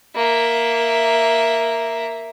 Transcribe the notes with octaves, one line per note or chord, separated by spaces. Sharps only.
A#3 E5